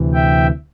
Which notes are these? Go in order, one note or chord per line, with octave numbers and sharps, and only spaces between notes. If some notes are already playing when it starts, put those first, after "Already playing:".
Already playing: D2 C3 E3
E5 G5